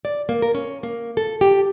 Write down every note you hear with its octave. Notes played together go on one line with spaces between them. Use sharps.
D5
A#3
A#4
C#4
A#3
A4
G4